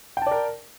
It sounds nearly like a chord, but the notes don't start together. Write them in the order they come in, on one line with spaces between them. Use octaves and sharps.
G5 A5 D5 A#4